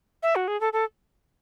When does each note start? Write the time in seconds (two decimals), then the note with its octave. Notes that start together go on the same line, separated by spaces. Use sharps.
0.23 E5
0.36 F#4
0.48 G#4
0.61 A4
0.73 A4